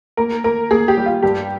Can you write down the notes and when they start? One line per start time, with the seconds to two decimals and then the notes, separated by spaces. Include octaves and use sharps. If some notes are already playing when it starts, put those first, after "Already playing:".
0.17 A#3 A#4
0.44 A#3 A#4
0.71 A#3 G#4
0.88 G4
0.97 G3
1.06 F4
1.22 G2 G4